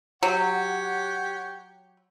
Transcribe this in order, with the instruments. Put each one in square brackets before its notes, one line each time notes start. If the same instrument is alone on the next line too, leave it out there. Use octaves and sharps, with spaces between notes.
[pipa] F#3 [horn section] G4 C#5 F#5